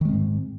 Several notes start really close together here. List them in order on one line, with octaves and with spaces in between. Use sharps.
D#3 G#3 C4 G#2